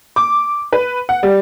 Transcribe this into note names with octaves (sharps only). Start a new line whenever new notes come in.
D6
B4
F#5
G3